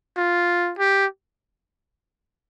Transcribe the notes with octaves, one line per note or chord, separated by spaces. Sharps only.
F4
G4